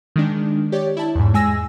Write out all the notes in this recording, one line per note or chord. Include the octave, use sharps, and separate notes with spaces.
D#3 G#3 D4
G4 C#5 D5
E4 A5
E2 G#2
G#3 G#5 E6 A#6